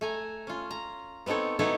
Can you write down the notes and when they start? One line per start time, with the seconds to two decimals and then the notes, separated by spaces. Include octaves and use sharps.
0.01 A3 G#5 A#5
0.47 C#4 F4
0.71 A#5
1.26 B3 C4 D#4 A4 C#5
1.59 F#3 B3 D#4 E4 A4 C#5